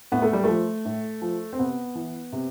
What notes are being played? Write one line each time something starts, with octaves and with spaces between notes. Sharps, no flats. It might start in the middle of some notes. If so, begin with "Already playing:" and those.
A2 B3
A3
G3
F3 A3
A2
F3
C4
C3 B3
E3
C3